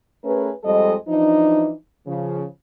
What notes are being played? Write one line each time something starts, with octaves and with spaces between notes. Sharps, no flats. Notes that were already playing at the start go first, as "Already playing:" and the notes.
A3 C#4 G#4 A#4 B4
F2 G3 G#3 A4 D#5
E3 F3 D4 D#4
C#3 F3